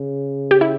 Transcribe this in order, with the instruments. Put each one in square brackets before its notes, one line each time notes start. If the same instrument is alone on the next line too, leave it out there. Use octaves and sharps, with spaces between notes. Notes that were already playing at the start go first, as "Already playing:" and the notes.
Already playing: [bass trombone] C#3
[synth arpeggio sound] G4
E4